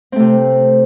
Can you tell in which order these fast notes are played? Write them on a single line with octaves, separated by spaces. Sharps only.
C4 A3 C3